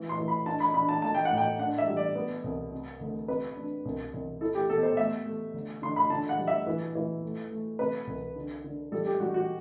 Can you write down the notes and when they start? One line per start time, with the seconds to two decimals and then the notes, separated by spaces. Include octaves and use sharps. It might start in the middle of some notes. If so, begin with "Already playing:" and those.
Already playing: E3
0.09 C6
0.19 E3
0.28 B5
0.46 D4 A5
0.60 B5
0.74 D4 B5
0.89 A5
1.02 A3 A5
1.14 G5
1.25 F#5
1.30 A2
1.37 G5
1.59 D4 F#5
1.78 E5
1.88 G3
1.97 D5
2.15 B3
2.44 C2
2.72 C3
3.00 D2
3.28 C3 B4
3.56 D4
3.85 C2
4.13 C2
4.41 E4 A4
4.55 G4
4.69 B2 A4
4.83 C5
4.97 A3 E5
5.26 A3
5.53 D2
5.82 D3 C6
5.96 B5
6.10 D3 A5
6.29 F#5
6.39 G3
6.48 E5
6.67 E3
6.95 E3
7.23 A3
7.51 A3
7.79 C3 B4
8.07 C2
8.36 D3
8.64 D3
8.92 G3 A4
9.06 G4
9.20 G3 F#4
9.34 F#4